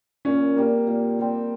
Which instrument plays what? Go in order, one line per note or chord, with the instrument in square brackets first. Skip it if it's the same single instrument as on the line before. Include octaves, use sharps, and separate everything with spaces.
[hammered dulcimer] A#2 [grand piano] C#4
[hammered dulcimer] G3 C4 [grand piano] A#3
[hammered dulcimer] A#2
G3 C4